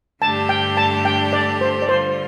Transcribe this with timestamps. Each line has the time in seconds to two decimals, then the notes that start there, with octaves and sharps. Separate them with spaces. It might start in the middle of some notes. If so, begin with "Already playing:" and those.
0.22 G2 D3 A3 D4 G4 A5
0.49 G5
0.77 A5
1.05 G5
1.33 D5
1.61 C5
1.82 D5
1.89 D3 G3 F4 C5